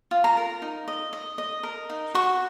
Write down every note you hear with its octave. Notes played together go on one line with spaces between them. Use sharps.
F4
A#5
A#4
D#4
D#5
D#5
D#5
A#4
D#4
F#4 C#6